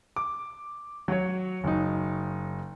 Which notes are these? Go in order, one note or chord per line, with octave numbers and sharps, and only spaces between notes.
D6
F#3 F#4 C#5
F#1 F#3 D#4